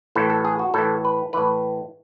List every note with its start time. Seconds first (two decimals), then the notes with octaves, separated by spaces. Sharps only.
0.15 A2 E3 A4
0.30 A4
0.45 G#4
0.59 F#4
0.74 A2 E3 A4
1.05 B4
1.33 A2 E3 B4